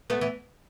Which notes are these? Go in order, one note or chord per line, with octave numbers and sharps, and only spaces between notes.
A3 B3
E3